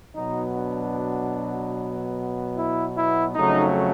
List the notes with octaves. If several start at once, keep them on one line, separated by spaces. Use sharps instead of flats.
B2 F#3 B3 D#4
D4
E4
E4
F2 C#3 F#3 A3 D#4